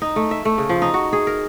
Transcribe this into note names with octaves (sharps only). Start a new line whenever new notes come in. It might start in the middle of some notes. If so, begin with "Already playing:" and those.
D#4
A3
E5
A3
C#3
F3
D#4
F#4
G#4
A#4